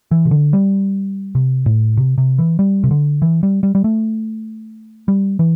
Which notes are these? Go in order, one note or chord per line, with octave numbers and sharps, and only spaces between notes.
E3
C3
D3
G3
C3
A2
C3
C3
E3
G3
C3
D3
E3
G3
G3
G3
A3
G3
E3